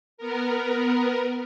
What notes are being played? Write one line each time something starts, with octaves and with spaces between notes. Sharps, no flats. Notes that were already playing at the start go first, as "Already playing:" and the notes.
B3 A#4